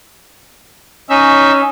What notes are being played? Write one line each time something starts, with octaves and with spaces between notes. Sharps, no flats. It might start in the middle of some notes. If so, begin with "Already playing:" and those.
C#4 D#4 E5